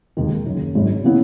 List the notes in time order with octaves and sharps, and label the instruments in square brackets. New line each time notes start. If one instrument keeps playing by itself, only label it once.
[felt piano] E1 D#2 D#3
F#1 F#2 D#3
G#1 G#2 F#3
C#3 E3 B3 E4